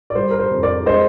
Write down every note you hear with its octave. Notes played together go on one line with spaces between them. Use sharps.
D5
G3 C5
A#4
C5
F2
A#4 D5
G#3 C5 D#5